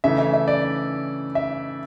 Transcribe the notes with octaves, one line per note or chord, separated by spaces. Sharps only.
C#3 E3 A3 E5
E5
E5
D5
E5